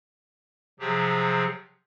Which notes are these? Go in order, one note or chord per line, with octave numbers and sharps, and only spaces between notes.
C3 F3 F#3 G4 G#4